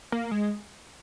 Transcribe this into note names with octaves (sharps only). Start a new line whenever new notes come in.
A#3
G#3